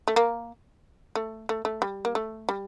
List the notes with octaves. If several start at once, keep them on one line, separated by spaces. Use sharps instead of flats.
A3
A#3
A3
A3
A3
G3
A#3
A3
G3